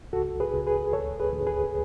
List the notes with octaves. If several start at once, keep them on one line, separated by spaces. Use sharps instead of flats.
C#2 F#4 A4
G#4 B4
C#2
G#4 B4
D2 A4 C#5
G#4 B4
D2
G#4 B4